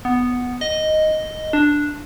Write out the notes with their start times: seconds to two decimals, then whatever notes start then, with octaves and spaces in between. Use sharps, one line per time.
0.05 B3
0.61 D#5
1.53 D4